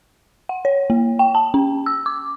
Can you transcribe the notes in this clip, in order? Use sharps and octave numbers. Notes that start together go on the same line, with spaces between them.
F#5
C#5
A#3
G5
A5
C#4
E6
D6